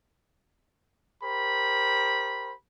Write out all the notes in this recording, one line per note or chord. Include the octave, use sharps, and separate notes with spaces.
G4 A#4 C5 B5